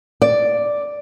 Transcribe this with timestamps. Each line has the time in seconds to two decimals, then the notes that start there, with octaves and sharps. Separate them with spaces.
0.22 D5